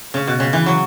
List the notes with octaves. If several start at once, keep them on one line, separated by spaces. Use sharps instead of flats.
C#3
B2
C#3
E3
F#3